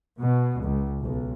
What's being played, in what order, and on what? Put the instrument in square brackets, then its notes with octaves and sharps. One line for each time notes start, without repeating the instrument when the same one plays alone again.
[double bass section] B2
C#2
B1